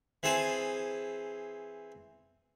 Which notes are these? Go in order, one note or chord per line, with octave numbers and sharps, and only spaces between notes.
E3 C4 G#4 A5